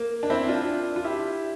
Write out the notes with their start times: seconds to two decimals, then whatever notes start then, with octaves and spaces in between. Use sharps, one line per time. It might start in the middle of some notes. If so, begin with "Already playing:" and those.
Already playing: A#3
0.23 D4
0.30 C4 E4
0.48 D4 F4
0.96 F4
1.05 E4 G4